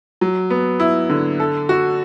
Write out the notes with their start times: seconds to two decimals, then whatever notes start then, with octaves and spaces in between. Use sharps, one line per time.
0.21 F#3
0.50 B3
0.80 E4
1.10 D3
1.40 A4
1.69 F#4